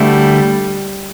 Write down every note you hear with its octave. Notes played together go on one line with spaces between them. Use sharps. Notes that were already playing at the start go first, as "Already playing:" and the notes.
Already playing: D2 D3 G3 A3 E4